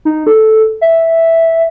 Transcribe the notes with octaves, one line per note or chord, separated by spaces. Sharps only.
D#4
A4
E5